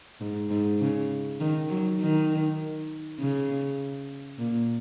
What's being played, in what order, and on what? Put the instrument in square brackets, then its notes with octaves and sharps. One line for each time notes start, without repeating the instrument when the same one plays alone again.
[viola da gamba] G#2
G#2
C#3
D#3
F#3
D#3
C#3
A#2